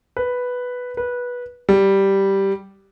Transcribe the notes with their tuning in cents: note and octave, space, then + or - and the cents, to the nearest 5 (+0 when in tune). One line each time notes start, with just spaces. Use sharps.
B4 +0
B4 -15
G3 -5